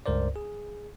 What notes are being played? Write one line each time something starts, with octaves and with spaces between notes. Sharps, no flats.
C#2 G2 A#4 C5 D5
G#4